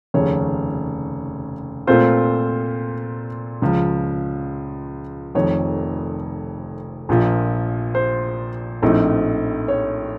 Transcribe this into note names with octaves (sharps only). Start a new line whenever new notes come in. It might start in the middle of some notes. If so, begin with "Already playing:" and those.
F1 D#2 C#3 C#5
A#2 A3 C4 F4 C5
C#2 C#3 F3
F1 F2 D#3 C#5
A#1 A#2 F3
C5
A#1 A2 A3 C4 D#4
C#5